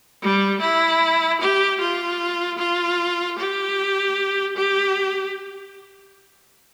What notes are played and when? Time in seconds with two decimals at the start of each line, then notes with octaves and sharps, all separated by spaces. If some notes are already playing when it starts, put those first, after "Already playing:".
0.22 G3
0.61 E4
1.40 G4
1.80 F4
2.58 F4
3.38 G4
4.56 G4